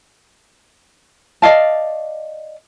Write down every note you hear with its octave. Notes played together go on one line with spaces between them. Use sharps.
D5 D#5 F5 A5